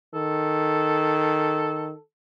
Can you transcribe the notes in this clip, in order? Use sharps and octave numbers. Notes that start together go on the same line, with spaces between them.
D#3 A4